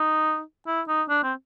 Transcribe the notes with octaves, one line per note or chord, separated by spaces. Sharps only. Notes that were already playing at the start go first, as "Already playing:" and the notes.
Already playing: D#4
E4
D#4
D4
C4